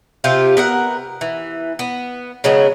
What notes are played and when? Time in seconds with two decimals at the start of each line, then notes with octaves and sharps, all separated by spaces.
0.24 C3 F4 G4
0.57 B3 A#4 F#5
1.21 E3
1.79 B3
2.44 C#3 F#3 G#3 B3